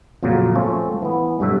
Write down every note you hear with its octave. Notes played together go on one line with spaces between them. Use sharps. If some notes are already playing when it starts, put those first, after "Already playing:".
F2 A#2 C#3 F#3 A#3
F3 A3 C4 C#4
E3 B3
G2 B2 F#3 A3 E5